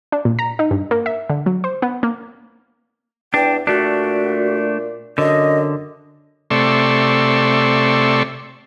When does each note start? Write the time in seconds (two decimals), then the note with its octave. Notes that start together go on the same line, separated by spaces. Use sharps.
0.12 D4
0.25 A#2
0.39 A#5
0.59 D#4
0.71 G2
0.91 A#3
1.06 E5
1.30 D3
1.46 F#3
1.64 C5
1.82 B3
2.03 A#3
3.34 E2 D4 G5
3.67 A#2 A3 D4 F#4
5.18 F#2 D3 D#5
6.51 C3 A3 D5 C6 C#6 E6